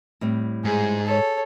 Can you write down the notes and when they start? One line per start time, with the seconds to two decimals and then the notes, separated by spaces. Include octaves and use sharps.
0.21 A2 G3 C4
0.65 G#2 G#4
1.07 A4 C#5